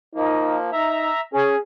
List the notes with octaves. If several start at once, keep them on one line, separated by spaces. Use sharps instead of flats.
F3 A#3 D#4
D#4 E5 A#5
C#4 G#4